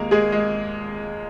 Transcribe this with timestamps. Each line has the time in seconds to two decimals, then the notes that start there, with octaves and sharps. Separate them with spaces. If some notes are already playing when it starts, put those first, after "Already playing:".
Already playing: D#2 G#3 A#3 A#4
0.11 G#3 G#4
0.32 G#3